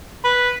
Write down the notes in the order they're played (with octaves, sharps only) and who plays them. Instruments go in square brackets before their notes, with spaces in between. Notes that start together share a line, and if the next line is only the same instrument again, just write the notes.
[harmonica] B4